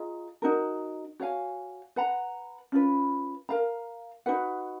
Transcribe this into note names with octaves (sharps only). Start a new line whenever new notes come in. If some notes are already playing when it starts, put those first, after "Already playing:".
Already playing: F4 G#4 D#5 A#5
D#4 F#4 A#4
F#4 C#5 F5 G#5
B4 F#5 A#5
C#4 F4 B4
A#4 F5 A#5
D#4 F#4 B4 F#5